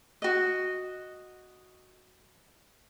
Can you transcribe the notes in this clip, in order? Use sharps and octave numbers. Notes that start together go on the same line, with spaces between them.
F#4 D#5